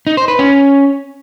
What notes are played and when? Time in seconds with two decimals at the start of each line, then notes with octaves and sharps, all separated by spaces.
0.07 D#4
0.17 C5
0.28 B4
0.39 C#4